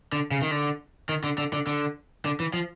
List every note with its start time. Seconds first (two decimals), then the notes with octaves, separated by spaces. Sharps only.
0.13 D3
0.31 C#3
0.42 D#3
0.51 D3
1.09 D#3
1.24 D3
1.38 D3
1.53 D3
1.67 D3
2.25 D3
2.40 E3
2.54 F3